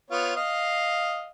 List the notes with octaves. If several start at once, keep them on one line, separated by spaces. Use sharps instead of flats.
B3 F4 C#5
D#5 F5